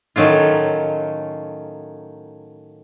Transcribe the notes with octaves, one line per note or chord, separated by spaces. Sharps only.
A2 D#3 F#3 C#4 F4